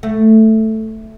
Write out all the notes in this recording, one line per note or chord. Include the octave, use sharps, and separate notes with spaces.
A3